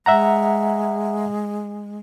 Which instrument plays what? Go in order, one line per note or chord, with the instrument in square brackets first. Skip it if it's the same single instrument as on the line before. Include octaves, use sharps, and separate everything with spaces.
[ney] G#3 [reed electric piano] E5 F#5 A#5